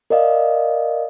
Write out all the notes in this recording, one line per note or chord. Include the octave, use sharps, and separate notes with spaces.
A#4 D5 D#5 F5